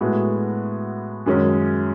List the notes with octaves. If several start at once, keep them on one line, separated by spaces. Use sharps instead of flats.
A2 G#3 B3 F#4
F#2 D#3 G#3 C#4